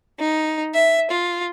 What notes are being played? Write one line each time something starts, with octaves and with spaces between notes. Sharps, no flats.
D#4
E5
F4